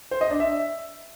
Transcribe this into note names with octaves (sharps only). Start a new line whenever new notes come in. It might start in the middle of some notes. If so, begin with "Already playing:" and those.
C5
D#5
D4
E5